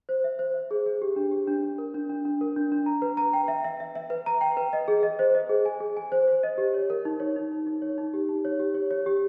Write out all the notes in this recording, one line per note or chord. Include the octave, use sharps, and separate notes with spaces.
C5
E5
C5
E5
G#4
G#4
G4
D4
G4
D4
D4
A#4
D4
D4
D4
A#4
D4
D4
A#5
B4
A#5
G5
E5
E5
E5
E5
B4
A#5
G5
B4
D#5
G#4
D#5
C5
D#5
G#4
G#5
G#4
G#5
C5
C5
D#5
G4
C#5
A#4
D#4
C#5
D#4
D#4
D#4
C#5
D#4
G4
D#4
C#5
G4
C#5
C#5
G4